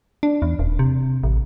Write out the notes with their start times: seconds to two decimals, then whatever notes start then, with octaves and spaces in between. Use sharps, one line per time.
0.23 D4
0.42 E2
0.59 D#1
0.79 C3
1.23 A1